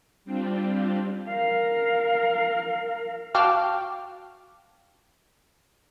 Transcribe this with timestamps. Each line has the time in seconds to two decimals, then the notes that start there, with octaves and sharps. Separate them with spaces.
0.25 G3 C4 D4 F4 G4
1.28 A#4 F5
3.35 F#4 F5 G5 A5 D6 F6